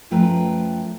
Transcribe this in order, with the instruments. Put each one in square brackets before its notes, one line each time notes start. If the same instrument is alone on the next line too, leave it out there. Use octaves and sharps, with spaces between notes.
[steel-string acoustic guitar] F#2 F3 A3 B4 G5 A#5